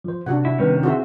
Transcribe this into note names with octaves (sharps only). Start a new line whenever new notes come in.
F3 C5
C3 D4 F#4 F#5
E4
C3 D#3 G3 B3 C#4 B4
C4 E4 F#4 G#4 C5 E5